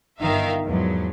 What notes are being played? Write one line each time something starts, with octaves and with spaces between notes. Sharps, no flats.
G1 D#3 D#4 E5 F5
E2 G#2 F3 F#3